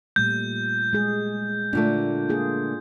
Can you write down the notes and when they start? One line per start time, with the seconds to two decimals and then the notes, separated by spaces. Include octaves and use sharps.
0.16 A#2 G3 A3 G6
0.93 G#3 G#4
1.73 A#2 D3 A3 D4
2.29 A#3 F4 G#4